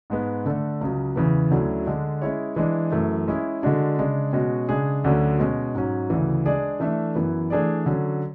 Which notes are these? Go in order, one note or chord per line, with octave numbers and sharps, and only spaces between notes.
G#2 G#3 B3
D3 A3 D4 A4
C#2 C#3 F#3
E2 C#3 E3 B3
D2 D3 F#3 C#4 E4
D3 G#3 D4
G#3 C#4 E4 G#4 C#5
E3 G#3 D4
F#2 E3 A3
G#3 C#4 E4 G#4
D3 G#3 D4 F#4
C#3 G#3 D4
B2 G#3 C#4 F#4
C#3 G#3 D4 G#4
D2 D3 F#3 C#4
B2 G#3 C#4
G#2 F#3 C#4
D2 C#3 E3
G#3 D4 G#4 D5
E3 A3 D4 A4 E5
F#2 E3 B3 E4
E3 A3 D4 G#4 D5
D3 F#3 C#4